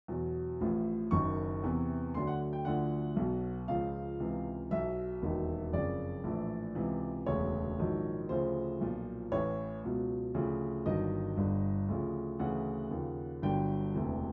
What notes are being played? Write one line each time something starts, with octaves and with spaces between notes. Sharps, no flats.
E2 B2 F#3
A1 A2 F3
F#1 F#2 D#3 F#3 C#6
E2 C3 E3
D2 D3 F#3 C6
F#5
G5
D2 D3 F3 F#5
B1 B2 F#3
C#2 C#3 F3 F5
C#2 C3 E3
B1 B2 F#3 E5
E1 D#2 D#3 F#3
F#1 F2 C#3 D5
A#1 A2 E3
C#2 C3 E3
E1 D2 C#3 C#5
A#1 G#2 D#3 F#3
D2 C#3 F3 C5
B1 A#2 F3
A1 A2 E3 C#5
C#2 B2 F#3
D2 C#3 F3
G1 G2 D#3 F#3 D#5
G1 G2 D3
D2 C#3 F3
D2 C#3 E3 F#5
D#2 C#3 F3
G1 G2 D3 F#3 G5
E1 D2 C3 E3